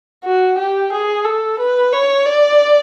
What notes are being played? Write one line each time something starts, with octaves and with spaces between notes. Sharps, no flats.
F#4
G4
G#4
A4
B4
C#5
D5